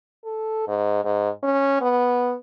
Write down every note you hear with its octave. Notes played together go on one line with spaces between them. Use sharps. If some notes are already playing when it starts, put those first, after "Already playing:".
A4
G#2
G#2
C#4
B3